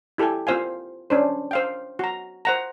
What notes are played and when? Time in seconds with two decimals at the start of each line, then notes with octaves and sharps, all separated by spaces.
0.18 E4 G4 A4 E5 G#5
0.47 C4 F4 C5 F5 G#5
1.10 C#4 D4 C5
1.51 C5 F5 G5
1.99 F#4 A#5
2.45 C5 F#5 A#5